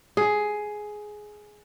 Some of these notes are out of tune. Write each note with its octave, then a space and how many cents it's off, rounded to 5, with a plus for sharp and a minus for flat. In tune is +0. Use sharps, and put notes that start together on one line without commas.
G#4 +10